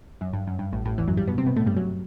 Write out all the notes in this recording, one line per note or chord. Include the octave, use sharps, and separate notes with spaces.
F#2
G2
F#2
G2
A1 A2
A1 A2
E2 E3
F#2 F#3
G2 G3
B2 B3
C3 C4
B2 B3
A2 A3
G2 G3
F#2 F#3